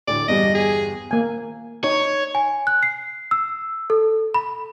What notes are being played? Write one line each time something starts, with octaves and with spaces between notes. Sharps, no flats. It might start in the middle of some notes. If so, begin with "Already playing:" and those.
D2 A2 D3 D5
G1 E2 G3 D#5
G#4
A#3 G#5
D#4 C#5
G#5
F#6
C7
E6
A4
B5